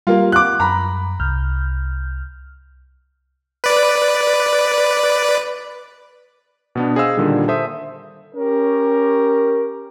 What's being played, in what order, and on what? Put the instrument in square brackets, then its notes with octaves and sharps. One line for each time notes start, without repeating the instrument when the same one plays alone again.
[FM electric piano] G3 G4 [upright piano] A#3 F4
[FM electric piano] F5 F#5 [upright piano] D6 F#6
[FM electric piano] F#2 [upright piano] A#5 B5
[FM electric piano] C2 F6 G6
[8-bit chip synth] B4 D5
[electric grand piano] B2 B3 D4
G#4 C5 D#5 F5 E6
A#2 D3 D#3 G3
A4 C5 E5 D#6
[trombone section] C#4 G4 A#4